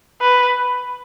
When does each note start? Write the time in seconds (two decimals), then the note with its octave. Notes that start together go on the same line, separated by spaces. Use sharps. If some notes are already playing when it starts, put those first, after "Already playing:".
0.22 B4